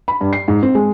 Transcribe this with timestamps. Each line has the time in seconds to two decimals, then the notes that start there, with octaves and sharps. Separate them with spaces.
0.08 B5
0.21 G2
0.33 C7
0.48 G#2
0.63 C4
0.75 G#3